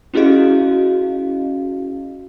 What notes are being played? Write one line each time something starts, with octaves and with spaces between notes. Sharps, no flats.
C#4 E4 F#4 G#4 D#5 F5